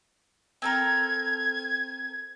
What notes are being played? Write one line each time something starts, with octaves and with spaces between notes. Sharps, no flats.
C4 A4 A#4 G#6